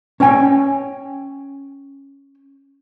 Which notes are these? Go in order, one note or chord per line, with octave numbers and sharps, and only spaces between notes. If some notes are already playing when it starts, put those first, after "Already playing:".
C#4 C#5 G5 G#5